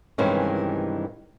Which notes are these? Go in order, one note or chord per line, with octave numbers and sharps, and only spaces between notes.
G2 C3 D#3 E3 G#3 C#4